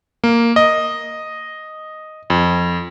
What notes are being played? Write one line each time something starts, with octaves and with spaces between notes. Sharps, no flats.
A#3
D#5
F2